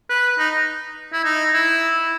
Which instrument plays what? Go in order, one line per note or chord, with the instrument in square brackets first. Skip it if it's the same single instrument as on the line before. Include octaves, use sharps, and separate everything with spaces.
[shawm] B4
D#4
E4
D#4
E4